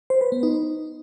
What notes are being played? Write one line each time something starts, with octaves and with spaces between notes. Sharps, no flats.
C5
B4
B3
D#4